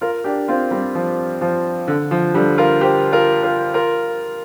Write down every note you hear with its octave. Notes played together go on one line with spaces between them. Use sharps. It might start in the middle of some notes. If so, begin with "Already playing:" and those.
F4 A#4
D4 G4
C4 F4
G3 C4
F3
F3
D3
F3
D3 G3
F4 A#4
G4 C5
F4 A#4
F4 A#4
F4 A#4